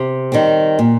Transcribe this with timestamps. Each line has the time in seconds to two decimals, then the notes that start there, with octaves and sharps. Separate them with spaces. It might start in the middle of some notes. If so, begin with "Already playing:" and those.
Already playing: C3
0.32 D#3 G3 C4
0.79 A#2